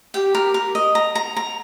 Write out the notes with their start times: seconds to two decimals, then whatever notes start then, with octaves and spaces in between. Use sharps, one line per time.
0.14 G4 G5
0.35 A#4
0.54 A#4
0.75 D#5
0.95 A#5
1.15 A#5
1.36 A#5